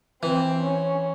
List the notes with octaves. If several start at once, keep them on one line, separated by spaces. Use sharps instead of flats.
E3 C4
C#4